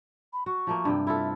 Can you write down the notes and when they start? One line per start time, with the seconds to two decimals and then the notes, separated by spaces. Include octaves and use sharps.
0.33 B5
0.46 F#4 C#6
0.67 F3 A3 A#3
0.85 G2 C3 G5
1.07 E4 F4 A4 E5